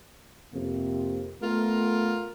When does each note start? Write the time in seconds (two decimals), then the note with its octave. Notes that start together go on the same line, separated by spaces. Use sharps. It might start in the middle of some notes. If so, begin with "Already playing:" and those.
0.52 F2 C3 A#3
1.42 A3 B3 F4 A#4